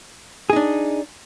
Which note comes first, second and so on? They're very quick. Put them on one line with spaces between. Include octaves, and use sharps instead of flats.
G#4 D#4 D4